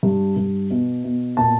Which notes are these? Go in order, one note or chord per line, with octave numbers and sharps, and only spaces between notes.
G2
G2
B2
B2
A#2 A5